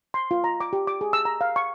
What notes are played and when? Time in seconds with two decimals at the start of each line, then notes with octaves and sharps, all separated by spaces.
0.14 C6
0.31 F4
0.44 A#5
0.60 D6
0.73 G4
0.87 D6
1.01 G#4
1.13 E6
1.25 A#5
1.41 F5
1.56 C#6